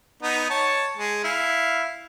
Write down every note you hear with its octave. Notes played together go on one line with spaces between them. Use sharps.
B3 D#4
C#5 A5
G#3
E4 F5